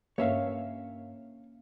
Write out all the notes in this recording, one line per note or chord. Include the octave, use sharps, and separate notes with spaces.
G2 A#3 C#4 C#5 E5 F5